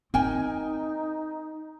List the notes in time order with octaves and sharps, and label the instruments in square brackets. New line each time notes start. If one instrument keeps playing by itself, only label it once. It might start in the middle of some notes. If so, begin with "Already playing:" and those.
[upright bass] C4 [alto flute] D#4 [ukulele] A#4 G5 G#5